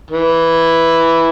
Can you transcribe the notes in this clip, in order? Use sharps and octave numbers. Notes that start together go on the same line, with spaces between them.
E3 E4